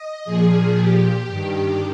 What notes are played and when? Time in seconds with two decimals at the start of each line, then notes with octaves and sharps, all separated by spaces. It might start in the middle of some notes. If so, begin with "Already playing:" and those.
Already playing: D#5
0.25 A#2 F3 G#4
0.76 G4
1.28 G2 D#3